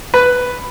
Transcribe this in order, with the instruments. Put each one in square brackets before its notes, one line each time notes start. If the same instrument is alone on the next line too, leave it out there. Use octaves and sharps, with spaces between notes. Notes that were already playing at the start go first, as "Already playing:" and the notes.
[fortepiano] B4